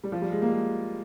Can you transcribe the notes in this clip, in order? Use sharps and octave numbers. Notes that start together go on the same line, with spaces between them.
G3
F3
G3
G#3
A#3
G#3